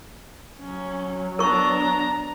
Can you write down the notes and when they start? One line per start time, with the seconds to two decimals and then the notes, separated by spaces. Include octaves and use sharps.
0.60 F#3 C#4
1.39 B3 D4 A#4 A#5 C#6